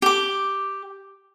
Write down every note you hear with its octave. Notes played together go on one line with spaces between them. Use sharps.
G4 D6